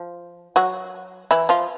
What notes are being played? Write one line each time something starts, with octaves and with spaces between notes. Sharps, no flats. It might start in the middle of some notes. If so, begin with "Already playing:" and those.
Already playing: F3
F#3 F#4
E3 E4
F3 F4